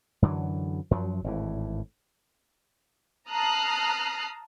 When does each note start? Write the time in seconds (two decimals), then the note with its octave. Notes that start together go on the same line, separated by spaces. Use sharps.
0.22 F#2 D3 E3 F#3
0.91 F#2 F3 F#3
1.24 G#1 A2 E3
3.30 A5 A#5 D#6 F6 F#6 C7